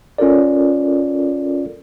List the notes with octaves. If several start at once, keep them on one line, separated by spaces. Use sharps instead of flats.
C#4 F4 A4 A#4 D5